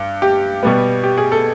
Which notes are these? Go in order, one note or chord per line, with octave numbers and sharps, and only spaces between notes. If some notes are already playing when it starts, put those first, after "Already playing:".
Already playing: G2
G4
B2 G3 B3
G4
G#4
A4